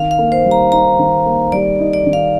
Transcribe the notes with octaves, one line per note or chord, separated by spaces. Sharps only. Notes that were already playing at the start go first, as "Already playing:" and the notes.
Already playing: D#3 F5
F5
A#3
C5
G3
A#5
D#4 A#5
D#3
A#3
G3 D5
D#4
D5
D#3
F5